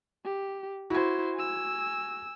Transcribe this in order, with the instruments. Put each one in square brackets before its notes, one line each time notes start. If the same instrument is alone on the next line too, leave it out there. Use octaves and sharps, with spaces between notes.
[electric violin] G4
[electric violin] E4 C5 [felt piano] F#4 G#6
[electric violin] G#5 E6